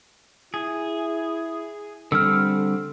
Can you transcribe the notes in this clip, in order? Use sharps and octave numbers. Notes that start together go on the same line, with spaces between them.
E4 G#4
D3 G3 C4 A4 E6 F6